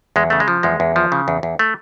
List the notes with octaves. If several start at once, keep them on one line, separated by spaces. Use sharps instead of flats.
E2 G#3
C#3 A3
G#3
F3
E2 G#3
E2
F3
C#3
E2
E2
A3